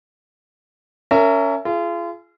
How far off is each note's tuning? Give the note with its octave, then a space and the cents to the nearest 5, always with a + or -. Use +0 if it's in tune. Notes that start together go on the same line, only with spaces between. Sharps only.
C#4 +20 A#4 -20 E5 +15
F4 -35 G#4 +20